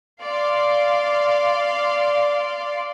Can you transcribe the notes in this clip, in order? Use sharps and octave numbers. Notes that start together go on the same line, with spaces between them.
D5 F5 C6